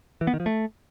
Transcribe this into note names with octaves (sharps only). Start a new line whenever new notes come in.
E3
B3
D#3
F3
A3